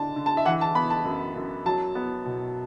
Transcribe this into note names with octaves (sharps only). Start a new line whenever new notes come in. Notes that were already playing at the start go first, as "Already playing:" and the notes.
Already playing: D3 D4 A5
D3
A5
E5
E3 F#5
A5
B3 B5
A5
F#2
F#2
F#3 A5
B3
B2